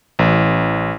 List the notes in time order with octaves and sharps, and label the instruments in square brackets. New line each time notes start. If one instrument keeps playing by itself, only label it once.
[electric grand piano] A1